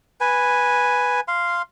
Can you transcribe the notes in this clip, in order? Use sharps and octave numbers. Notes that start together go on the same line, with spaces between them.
B4 G#5
F5 C6